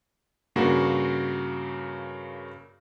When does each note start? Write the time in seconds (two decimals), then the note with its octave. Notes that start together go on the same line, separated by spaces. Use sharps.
0.56 G2 C#3 A#3 F#4